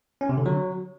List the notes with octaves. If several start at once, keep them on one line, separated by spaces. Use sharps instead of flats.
C#4
C3
D3
F#3